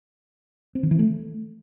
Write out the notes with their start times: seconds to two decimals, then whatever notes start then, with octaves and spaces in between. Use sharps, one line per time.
0.75 C4
0.83 D#3
0.91 E3
0.99 A3